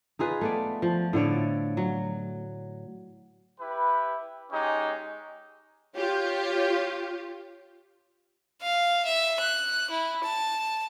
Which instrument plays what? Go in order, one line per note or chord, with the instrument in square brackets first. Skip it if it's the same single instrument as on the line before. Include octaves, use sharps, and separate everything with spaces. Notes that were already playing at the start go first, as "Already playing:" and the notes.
[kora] D#4 F4 G#4 B4
A3 B3 D5
F3
A2 D3 C#5 D5
F#3
[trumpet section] E4 G4 B4
G#3 C#4 D#4 G4
[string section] F4 G4 C#5
[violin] F5
E5
F#6
E4
A5